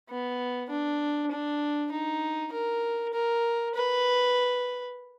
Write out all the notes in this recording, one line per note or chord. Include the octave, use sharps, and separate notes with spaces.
B3
D4
D4
D#4
A#4
A#4
B4